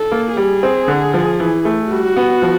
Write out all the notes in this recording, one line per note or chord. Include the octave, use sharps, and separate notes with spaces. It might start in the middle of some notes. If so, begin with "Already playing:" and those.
Already playing: A4
A#3
G3 G#4
C4
D3
F3
E3
A3
G3 F#4
B3
F3